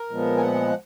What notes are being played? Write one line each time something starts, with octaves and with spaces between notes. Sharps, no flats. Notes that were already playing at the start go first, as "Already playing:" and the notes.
Already playing: A#4
A#2 F3 G#3 B3
G#5
F#5